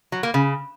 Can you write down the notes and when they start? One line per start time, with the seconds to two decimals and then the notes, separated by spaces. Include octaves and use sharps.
0.12 F#3
0.23 A#3
0.34 C#3